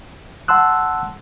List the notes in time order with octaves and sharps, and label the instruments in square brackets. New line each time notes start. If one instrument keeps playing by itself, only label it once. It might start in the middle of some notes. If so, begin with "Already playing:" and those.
[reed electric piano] F#5 A5 C6 E6 F#6